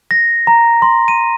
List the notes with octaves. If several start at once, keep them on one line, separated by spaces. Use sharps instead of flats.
A#6
A#5
C6
D#7